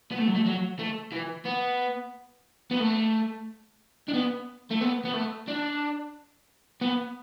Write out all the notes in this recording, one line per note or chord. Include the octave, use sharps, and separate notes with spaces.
B3
A3
F#3
A3
F#3
A3
E3
B3
B3
A3
D4
B3
A3
B3
B3
A3
D4
B3